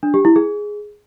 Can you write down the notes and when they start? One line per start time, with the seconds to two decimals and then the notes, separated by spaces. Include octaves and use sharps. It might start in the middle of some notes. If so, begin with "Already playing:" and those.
0.03 D4
0.14 G4
0.25 E4
0.36 G#4